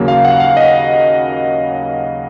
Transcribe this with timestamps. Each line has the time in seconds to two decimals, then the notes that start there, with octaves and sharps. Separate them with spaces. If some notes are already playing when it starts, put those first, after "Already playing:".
Already playing: D#2 C#3 F#3 A#3
0.08 F5
0.25 F#5
0.40 F5
0.57 D#5